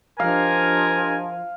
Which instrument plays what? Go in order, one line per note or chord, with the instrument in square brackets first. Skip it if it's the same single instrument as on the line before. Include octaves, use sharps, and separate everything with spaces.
[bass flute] F3 [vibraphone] D4 G4 D#5 [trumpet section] A#4 G#5 [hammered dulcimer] F5